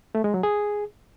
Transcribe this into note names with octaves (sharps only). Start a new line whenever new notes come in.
A3
G#3
F#3
G#4